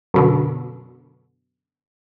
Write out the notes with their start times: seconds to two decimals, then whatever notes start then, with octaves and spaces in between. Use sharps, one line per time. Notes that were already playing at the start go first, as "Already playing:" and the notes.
0.14 F#2 B2 D3